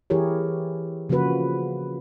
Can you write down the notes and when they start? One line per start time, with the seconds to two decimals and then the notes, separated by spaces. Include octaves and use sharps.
0.10 E3 E4 G4 G#4 A#4 C#5
1.09 C#3 F3 A#3 F#4 B4